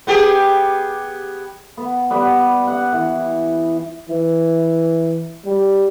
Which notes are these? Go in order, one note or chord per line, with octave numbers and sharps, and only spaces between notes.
B3 G4 G#4
B3
G3 B3
F#5
E3
E3
G3